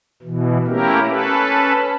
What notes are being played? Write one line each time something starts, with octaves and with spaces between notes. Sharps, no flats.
B2 E3
A3 A#3 C#4 E4 G4 A#4
C#4 A4 B4